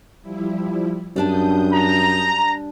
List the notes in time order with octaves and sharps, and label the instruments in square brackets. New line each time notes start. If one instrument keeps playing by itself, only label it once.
[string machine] F3 G3 E4
[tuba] F#2 [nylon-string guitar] G3 D4 A5 [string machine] D#6 G6
[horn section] A#5